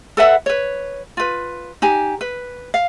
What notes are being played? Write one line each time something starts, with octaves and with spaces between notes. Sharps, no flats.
A4 B4 E5 F#5
B4 C#5
F4 B4
D#4 G4 G#5
B4
F5